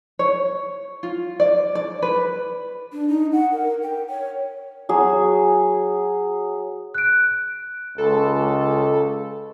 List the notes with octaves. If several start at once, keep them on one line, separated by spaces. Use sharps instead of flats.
C#5
F4
D5
D5
B4
D4
D#4
F#5
A#4
G5
C#5
F#3 G#4
F#6 D7
C#2 A4